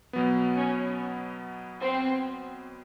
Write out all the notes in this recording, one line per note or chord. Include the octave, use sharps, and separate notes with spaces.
B2 F#3 B3
C#4
C4